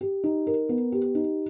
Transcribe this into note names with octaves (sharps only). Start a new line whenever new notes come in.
G4
D#4
A#4
B3
G4
D#4